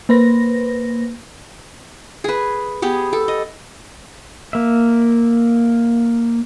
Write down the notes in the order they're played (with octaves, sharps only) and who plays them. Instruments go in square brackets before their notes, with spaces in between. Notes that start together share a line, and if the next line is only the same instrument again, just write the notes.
[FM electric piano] A#3 B4 C5 A#6
[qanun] G#4 B4
B3 G4 G#4
A4
D#5
[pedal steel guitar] A#3 E5